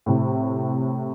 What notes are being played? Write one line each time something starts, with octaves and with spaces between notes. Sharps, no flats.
A2 C3